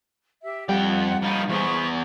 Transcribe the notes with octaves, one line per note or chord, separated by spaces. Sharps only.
G4 E5
F2 G3 F#5 G5
F3 D#4 F5 B5
E2 B3 G#4 C5 C#6